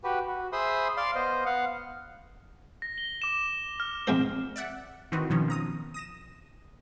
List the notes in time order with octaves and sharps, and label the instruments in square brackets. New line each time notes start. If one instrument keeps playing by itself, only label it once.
[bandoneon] F#4 G4 B4
F#4
G#4 C5 E5 B5 C6 D#6
D5 F5 C6
B3 C5 D#5
B3 F5 F#5
[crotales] A#6
G7
D6 E7
F6
[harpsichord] F2 G#3 C5
[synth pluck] D5 E5 F#5
D#3 E3 C4 D#4 F#4 B4
B2 D#3 F3 C#4
F3 A#5 D#6
D#6 A#6 E7